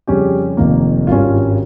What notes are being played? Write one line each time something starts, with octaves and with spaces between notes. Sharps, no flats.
F2 C#3 G3 C#4 G4
F1 F2 D#3 A#3
G#1 G2 G3 C#4 F4